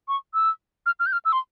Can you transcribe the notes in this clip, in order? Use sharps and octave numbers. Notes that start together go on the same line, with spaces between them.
C#6
E6
F6
F6
G6
F6
E6
C6